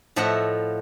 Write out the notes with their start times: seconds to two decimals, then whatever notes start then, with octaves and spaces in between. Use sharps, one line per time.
0.16 A2 F3 A4 D#5 E5 F#5